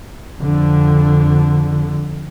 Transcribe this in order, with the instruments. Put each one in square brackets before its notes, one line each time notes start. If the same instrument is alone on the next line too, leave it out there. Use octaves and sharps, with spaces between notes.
[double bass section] F2 D3